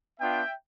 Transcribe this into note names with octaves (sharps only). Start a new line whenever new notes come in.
B3 D4 F4 E5 G5